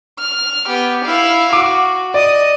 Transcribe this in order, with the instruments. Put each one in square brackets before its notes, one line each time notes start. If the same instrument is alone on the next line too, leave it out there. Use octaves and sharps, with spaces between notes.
[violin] F6
B3 G4
E4 F5
[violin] F#4 [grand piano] D6
[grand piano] D5 [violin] D#5 D#6